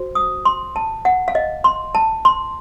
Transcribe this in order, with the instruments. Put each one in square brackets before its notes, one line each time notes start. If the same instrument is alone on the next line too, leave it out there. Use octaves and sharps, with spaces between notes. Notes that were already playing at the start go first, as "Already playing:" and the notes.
Already playing: [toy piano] F#4 C5
D#6
C6
A5
F#5
F5
D#5
C6
A5
C6